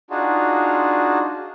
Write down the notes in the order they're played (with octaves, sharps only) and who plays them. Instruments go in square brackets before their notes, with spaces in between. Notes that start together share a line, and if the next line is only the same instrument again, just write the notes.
[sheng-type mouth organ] D4 D#4 F4 F#4 G#4